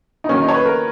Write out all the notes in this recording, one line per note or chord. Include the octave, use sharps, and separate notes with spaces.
D#4
D#3 F#3 A#3 C#4
D#4
C#5
B4
A#4